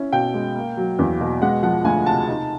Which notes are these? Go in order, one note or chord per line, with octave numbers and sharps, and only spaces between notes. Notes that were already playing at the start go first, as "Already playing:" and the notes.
Already playing: C#4 E4
B2 G5
G#3
A#3
F#3
E2
B2
G#3 F#5
F3 F#5
D2 G#5
C3 A5
D#4